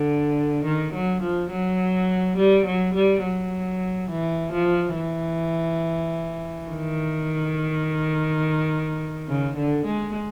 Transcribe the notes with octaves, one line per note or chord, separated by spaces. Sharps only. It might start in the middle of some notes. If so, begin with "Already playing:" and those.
Already playing: D3
D#3
F#3
F3
F#3
G3
F#3
G3
F#3
E3
F3
E3
D#3
C#3
D3
G#3